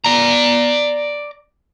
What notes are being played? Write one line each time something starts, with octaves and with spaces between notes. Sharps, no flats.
D5 A#5